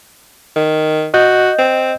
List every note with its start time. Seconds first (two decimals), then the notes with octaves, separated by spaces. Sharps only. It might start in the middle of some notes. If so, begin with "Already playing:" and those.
0.56 D#3
1.14 F#4 D#5 G6
1.58 C4